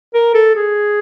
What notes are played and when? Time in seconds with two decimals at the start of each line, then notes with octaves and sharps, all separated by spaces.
0.14 A#4
0.34 A4
0.56 G#4